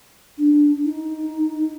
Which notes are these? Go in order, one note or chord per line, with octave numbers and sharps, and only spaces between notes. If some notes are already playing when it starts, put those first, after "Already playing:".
D4
D#4